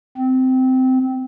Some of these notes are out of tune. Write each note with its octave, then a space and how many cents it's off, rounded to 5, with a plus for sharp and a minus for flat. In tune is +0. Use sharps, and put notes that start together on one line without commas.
C4 -15